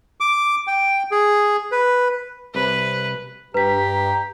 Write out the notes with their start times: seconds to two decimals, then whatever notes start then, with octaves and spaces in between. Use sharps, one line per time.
0.20 D6
0.67 G5
1.11 G#4
1.72 B4
2.55 C2 C3 B4
3.54 G2 G4 B4 A#5 B6